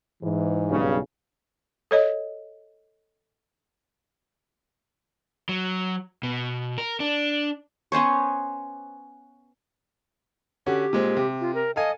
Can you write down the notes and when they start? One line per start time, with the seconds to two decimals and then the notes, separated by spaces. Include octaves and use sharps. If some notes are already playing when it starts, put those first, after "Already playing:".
0.23 G#2 E3
0.71 B1 G2 C#3
1.91 A4 C#5 D#5
5.49 F#3
6.23 B2
6.78 A#4
7.00 D4
7.92 B3 C#4 C5 C#5
10.66 D3 C#4 F#4 G4
10.93 A#2 G#3 C4
11.17 C3
11.41 F4
11.55 A#4
11.76 A4 D#5 F5 G#5